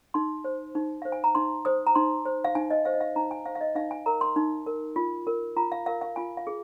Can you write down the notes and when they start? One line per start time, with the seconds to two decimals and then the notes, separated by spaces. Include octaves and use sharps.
0.14 D#4 C6
0.44 C5
0.75 D#4
1.02 C5 F5
1.12 G#5
1.24 A#5
1.35 D#4 C6
1.65 C5 D#6
1.87 A#5
1.95 D#4 C6
2.25 C5
2.44 F5
2.55 D#4 G#5
2.70 D#5
2.85 C5 F5
2.94 D#5
3.01 F5
3.16 D#4 A#5
3.31 G#5
3.45 C5 F5
3.55 F5
3.61 D#5
3.75 D#4 F5
3.91 G#5
4.06 A#4 A#5
4.21 C6
4.36 D#4
4.66 A#4
4.96 F4
5.27 A#4
5.56 F4 A#5
5.72 F5
5.86 A#4 F5
6.01 F5
6.16 F4 G#5
6.37 F5
6.47 G#4